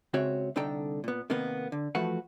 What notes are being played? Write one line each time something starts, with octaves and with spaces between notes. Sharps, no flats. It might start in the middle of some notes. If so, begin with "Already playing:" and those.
C#2 C#3 C4 F#4 C#5 E5
C2 D3 D#4 A4 G5 A#5
A#2 B3
C3 D#3 A#3 B3
D3
E3 F3 A3 F#4 B4 F#5